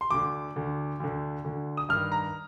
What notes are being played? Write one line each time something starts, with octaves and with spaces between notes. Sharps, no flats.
C6
D2 D3 D6
D2 D3
D2 D3
D2 D3
D#6
G2 D#3 F6
A#5